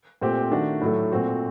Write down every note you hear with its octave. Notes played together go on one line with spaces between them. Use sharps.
A#2 A3 C4 G4
D#3 A3 D4 F#4
A2 F#3 A3
A#2 A3 C4 F#4